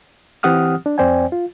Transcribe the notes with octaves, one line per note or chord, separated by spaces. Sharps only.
E3 C4 G4 F#5 D#6 F6
D4
F2 C4 C5 D5 G5 G#5
F4